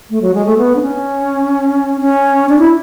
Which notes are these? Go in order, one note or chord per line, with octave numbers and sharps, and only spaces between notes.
A3
F#3
G#3
A3
B3
D4
C#4
C#4
D4
E4